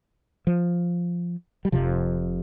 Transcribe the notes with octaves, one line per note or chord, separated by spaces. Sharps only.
F3
G3
F1 F2 C3 F3